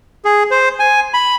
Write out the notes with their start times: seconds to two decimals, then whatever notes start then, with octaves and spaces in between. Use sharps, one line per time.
0.25 G#4
0.51 C5
0.79 G#5
1.14 B5